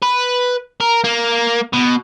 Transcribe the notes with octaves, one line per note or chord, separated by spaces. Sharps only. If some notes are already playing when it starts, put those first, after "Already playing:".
B4
A#4
A#3
B2